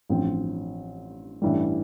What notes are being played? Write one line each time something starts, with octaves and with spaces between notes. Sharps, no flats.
A1 G2 F3 C4
A1 G2 E3 G3